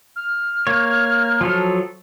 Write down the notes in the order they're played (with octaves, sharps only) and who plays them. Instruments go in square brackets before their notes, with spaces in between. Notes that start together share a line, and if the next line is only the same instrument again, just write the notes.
[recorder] F6
[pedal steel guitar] A#3 C#5
F3 F#3 A4